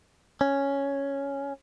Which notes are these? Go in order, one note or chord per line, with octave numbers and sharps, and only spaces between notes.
C#4